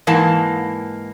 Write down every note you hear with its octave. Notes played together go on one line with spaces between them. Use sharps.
G#2 E3 A#3 A5